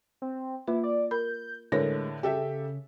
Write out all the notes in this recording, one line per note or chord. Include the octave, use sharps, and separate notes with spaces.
C4
A#3 E4 F4 B4
D5
A#4 B5 G6
A2 D3 G#3 A#4 B4 C#5 A#6
C#3 G4 A4 E5